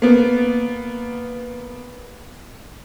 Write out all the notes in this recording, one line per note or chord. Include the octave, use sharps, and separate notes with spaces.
A#3 B3